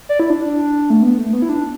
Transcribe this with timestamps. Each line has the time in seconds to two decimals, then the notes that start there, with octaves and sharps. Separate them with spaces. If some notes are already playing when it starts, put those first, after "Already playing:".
0.09 D5
0.20 E4
0.30 D4
0.40 D4
0.90 A3
1.02 B3
1.18 A3
1.33 B3
1.42 E4
1.49 D4